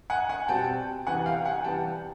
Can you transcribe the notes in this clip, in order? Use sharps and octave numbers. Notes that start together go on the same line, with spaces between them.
F#5 G#5
F#5 G#5
B2 G3 C4 G5 A5
C3 E3 G3 B3 F#5 G#5
F5 G5
F#5 G#5
C3 E3 G3 B3 G5 A5